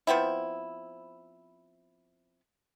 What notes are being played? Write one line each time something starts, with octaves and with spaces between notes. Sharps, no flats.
F3 B3 C4 E4